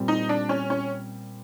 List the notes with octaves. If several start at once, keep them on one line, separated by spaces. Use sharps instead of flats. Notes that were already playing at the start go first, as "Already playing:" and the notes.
Already playing: A#2 G3 C4
D#4
D4
C#4
C#4